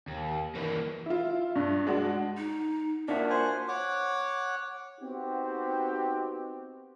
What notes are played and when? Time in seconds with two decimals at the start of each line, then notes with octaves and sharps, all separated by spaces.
0.08 D#2
0.55 E3 A#3
1.06 E4 F4
1.56 G2
1.87 G#3 D4 F#4
2.38 D#4
3.08 A#3 D4 F4 F#4 E5
3.29 C5 F#5 G#5
3.68 C#5 F#5 D6
5.01 B3 C4 D#4 F#4 G4